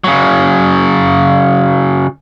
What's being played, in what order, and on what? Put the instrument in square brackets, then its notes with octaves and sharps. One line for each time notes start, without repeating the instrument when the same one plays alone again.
[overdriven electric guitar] C#3 F#3